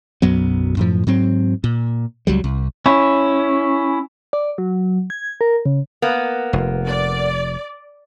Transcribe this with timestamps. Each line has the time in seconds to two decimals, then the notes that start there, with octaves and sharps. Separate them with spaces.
0.22 B1 F#2 F#3 B3
0.77 F#2 A2 F3
1.07 G#2 F#3 C4
1.64 A#2
2.27 C#2 F#3 G3
2.44 C2
2.86 C#4 E4
4.33 D5
4.58 F#3
5.10 G#6
5.41 A#4
5.66 C#3
6.02 A#3 B3
6.53 F1
6.88 D5